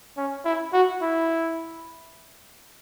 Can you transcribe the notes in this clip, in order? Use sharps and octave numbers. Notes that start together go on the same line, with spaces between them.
C#4
E4
F#4
E4